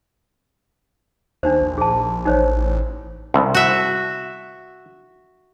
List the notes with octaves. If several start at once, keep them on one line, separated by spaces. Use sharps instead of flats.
D#2 D4 D#4 C5
A#1
G#4 A5
A1 D#4 C5 C#5
C2
F#4 E5